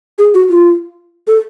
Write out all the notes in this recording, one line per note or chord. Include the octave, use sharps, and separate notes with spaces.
G#4
F#4
F4
A4